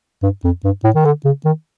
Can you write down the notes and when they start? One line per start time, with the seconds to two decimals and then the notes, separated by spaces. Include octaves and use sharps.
0.23 G2
0.44 F2
0.64 G2
0.84 A2
0.95 D#3
1.05 D3
1.25 C#3
1.45 D#3